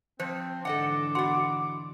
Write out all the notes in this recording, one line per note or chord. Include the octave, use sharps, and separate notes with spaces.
F3 C4 C5
G#2 D3 E3 A4 D#5 F#5 D6
B3 F#4 F#5 C6